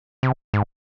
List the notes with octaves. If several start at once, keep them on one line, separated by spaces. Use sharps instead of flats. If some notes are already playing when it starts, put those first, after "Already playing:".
C3
G#2